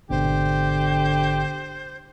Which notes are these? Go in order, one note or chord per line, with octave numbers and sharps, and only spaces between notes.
G#1 B2 D3 G4 C5